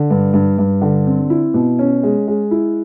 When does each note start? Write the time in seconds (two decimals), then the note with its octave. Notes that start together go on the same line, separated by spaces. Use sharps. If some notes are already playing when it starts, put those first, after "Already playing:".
Already playing: D3
0.10 G2
0.34 G2
0.58 G2
0.82 D3
1.07 C4
1.30 E4
1.54 B2
1.79 C#4
2.03 G#3
2.28 G#3
2.51 E4